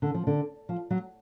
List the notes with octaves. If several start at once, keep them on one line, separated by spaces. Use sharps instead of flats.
D3
F3
D3
F3
F#3